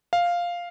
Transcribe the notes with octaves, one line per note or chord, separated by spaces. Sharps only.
F5